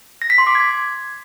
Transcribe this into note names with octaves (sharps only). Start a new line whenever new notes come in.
A#6
B6
C6
D6
G#6